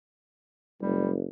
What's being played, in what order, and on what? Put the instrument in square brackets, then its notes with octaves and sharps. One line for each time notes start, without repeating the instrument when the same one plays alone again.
[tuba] F#1 [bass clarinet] G3